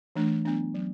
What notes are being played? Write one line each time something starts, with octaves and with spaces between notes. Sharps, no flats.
E3 A3 D4
F#3 B3 D4
F#3 B3